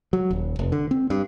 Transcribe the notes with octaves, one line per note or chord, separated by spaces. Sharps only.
F#3
D#1
F1
D3
C4
G2